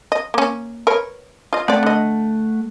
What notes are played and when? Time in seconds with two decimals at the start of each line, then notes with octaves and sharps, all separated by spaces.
0.12 D#5
0.34 A#3 C#4
0.87 A#4 B4 C#5
1.53 F4 D#5
1.68 A3 C4 D5 F#5
1.83 D3 D#5